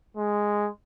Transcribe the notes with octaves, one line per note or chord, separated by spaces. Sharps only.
G#3